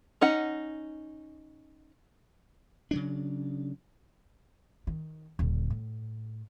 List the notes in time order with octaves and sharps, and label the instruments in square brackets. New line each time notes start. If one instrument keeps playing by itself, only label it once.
[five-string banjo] C#4 D#4 F#5
[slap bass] C#3 F#3 D4
[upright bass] D#3
D#1 D3
A2